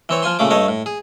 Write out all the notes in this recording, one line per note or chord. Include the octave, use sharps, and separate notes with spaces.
E3 C4 C#5
F3 F4 G#5 C6
A#2 C#3 A3 D6
G2 A3 C#5 D#5
A2
G#4